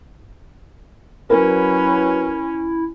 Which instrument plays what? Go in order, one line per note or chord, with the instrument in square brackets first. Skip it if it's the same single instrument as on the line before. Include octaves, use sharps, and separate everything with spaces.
[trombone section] F#3 B4 [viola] C#4 [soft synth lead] E4 [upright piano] A#4